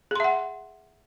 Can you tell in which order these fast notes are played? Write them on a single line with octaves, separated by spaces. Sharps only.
G#4 C6 E5 F#5